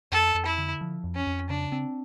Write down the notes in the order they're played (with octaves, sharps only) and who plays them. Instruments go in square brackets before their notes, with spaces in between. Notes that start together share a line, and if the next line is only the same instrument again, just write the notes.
[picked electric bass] F2 [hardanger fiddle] A4
[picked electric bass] F2
[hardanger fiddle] E4
[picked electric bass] D3
F3
F2
[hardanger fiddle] C#4
[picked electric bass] F2
[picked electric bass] C#3 [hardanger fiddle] D4
[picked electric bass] C4